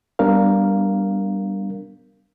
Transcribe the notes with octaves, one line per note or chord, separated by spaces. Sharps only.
G3 B3 D4 A#4 F5